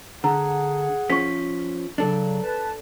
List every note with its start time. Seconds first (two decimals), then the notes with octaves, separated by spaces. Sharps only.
0.24 D3 G#4 F#5 A#5
1.10 F3 C#4 C#6 B6
1.98 C#3 F#3 D4 A4
2.43 B4 A5